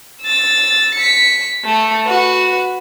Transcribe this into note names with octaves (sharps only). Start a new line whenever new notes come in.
E6 A6
B6 C#7
A3
F#4 B4